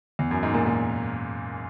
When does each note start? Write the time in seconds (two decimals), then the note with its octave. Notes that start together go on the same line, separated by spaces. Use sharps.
0.19 E2
0.31 F#2
0.43 G#2
0.54 A#2
0.66 A#2